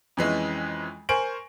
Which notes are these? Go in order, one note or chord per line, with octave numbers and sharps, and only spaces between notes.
F2 E3 G#3 C#4
A#4 C5 G#5 C#6 D7 F#7